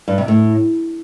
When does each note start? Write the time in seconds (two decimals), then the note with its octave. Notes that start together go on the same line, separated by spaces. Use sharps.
0.08 G2
0.18 C3
0.28 A2